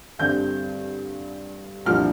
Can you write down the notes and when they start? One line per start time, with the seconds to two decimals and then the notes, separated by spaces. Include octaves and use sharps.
0.19 G2 D3 G3 C4 G6
1.86 C2 A#2 F3 D4 F6